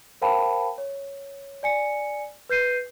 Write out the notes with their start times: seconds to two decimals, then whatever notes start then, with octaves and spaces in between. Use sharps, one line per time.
0.22 A#4 C5 F5 G5 A5 B5
0.78 C#5
1.63 D5 G#5 C#7
2.49 B4 G6 C7 D#7